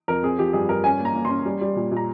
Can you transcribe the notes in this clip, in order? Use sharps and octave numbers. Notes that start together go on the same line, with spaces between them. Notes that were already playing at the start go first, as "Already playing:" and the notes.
F2 A#4
C4 G#4
F3 G4
G2 G#4
G2 A#4
C#4 G#5
A#3 A#5
A#3
C#4 C6
G3
G3
A#2
A#2
A#5